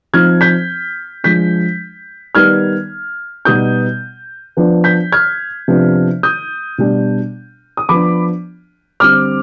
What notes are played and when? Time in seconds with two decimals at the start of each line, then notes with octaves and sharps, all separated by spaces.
0.13 F3 C4 D#4 F6 G#6
0.41 G6 B6
1.24 F3 G#3 D4 G6 B6
2.35 D#3 G3 B3 D#4 F6 G#6
3.45 B2 G3 B3 D#4 D#6 G6
4.57 F3 B3 D4
4.84 G6 B6
5.12 F6 G#6
5.68 C3 F3 B3 D4
6.23 D#6 G6
6.78 B2 G3 D4
7.77 D#6
7.89 F3 B3 D4 B5 D6
9.00 D3 G3 C4 D6 F6